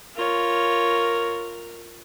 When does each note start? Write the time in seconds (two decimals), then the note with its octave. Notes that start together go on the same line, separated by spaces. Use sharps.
0.16 F4 A#4 C#5